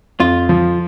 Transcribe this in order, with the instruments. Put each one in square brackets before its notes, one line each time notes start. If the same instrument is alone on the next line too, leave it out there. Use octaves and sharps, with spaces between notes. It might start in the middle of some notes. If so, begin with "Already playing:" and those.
[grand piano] F2 [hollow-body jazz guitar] F4
[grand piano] F3